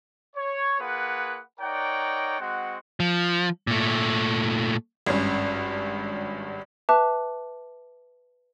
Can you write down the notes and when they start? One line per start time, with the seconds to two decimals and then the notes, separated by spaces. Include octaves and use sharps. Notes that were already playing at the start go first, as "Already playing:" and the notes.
0.36 C#5
0.80 A#3 F4 G#4 B4 F#5
1.60 D#4 A#4 C#5 D5 F#5 G5
2.40 G#3 C4 F#4 F#5
3.00 F3
3.67 A#2 A3
5.06 G#1 G2 C#4
6.89 B4 E5 A5 D6 F#6